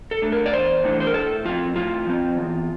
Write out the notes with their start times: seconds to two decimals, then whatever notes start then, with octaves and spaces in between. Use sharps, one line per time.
0.11 A4
0.22 A3 D4
0.32 A#4
0.46 D5
0.53 E2 C5
0.84 E3 A3 D4
1.00 C5
1.07 A#4
1.14 A2 A4
1.45 F3 C4 F4
1.76 A2 F4
2.07 F3 C4
2.38 E2